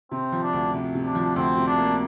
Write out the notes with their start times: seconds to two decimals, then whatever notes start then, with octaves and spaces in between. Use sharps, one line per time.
0.11 C3 C4
0.32 F3
0.43 D4
0.53 D2
0.73 C3
0.95 C3
1.05 D4
1.15 F3
1.36 D2 C4
1.58 C3
1.67 D4
1.78 A#3